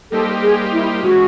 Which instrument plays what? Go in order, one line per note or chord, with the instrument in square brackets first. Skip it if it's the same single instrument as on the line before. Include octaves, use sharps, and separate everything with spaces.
[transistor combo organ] G3 A#3 D#4 G4 C5 [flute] A4
[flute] G#4
E4
[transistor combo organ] G#2 E3 G#3 C#4 [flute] F#4